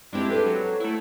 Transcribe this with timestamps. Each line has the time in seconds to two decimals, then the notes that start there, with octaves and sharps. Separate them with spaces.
0.13 G#3 C4 D4 E4 G4 G#4
0.29 A4 B4 C5
0.46 F#3
0.80 A3 E4